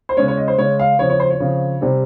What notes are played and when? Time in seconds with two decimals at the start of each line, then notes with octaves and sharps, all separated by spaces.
0.09 C5
0.17 C#3 G#3 C#4 C#5
0.28 C#5
0.37 D#5
0.48 C5
0.58 C#3 G#3 C#4 C#5
0.79 F5
0.99 C#3 F3 C4 C#5
1.10 C#5
1.20 C5
1.30 C#5
1.40 C#3 F3 C4
1.81 C3 G3 C4